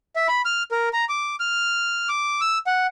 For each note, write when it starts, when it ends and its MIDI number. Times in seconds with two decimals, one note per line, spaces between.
0.16 0.27 76
0.28 0.42 83
0.45 0.63 89
0.71 0.89 70
0.93 1.05 82
1.09 1.36 86
1.40 2.09 89
2.09 2.41 86
2.41 2.58 88
2.67 2.87 78